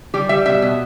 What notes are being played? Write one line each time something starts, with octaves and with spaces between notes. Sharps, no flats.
G3 G4
G3 E5
B2 E5
B2